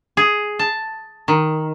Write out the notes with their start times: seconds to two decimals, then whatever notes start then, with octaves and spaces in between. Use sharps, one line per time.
0.17 G#4
0.59 A5
1.28 D#3